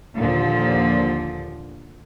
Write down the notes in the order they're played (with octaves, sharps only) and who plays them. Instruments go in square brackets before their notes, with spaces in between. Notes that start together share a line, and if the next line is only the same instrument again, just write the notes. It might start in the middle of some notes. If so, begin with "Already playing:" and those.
[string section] D#2 A#2 D3 F3